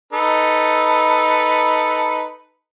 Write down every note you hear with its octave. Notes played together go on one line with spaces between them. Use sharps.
D#4 A4 B4